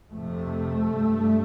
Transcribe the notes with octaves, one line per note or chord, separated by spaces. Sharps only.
F2 C3 A3
G2